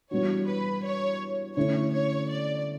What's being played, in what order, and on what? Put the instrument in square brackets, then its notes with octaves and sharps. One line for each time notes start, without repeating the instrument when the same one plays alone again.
[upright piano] E3 G3 B3 D4 F#4 [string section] C#5
[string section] B4
C#5
[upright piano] D3 A3 C#4 E4 [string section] C#5
[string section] C#5
D5